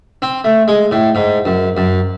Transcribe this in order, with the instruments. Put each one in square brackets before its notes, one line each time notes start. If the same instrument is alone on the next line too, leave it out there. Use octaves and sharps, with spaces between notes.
[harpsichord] C4
A3
G#3
A2
G#2
F#2
F#2